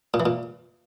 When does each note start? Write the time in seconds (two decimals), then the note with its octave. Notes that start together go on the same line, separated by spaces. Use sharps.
0.14 A#2
0.20 E3
0.26 A#2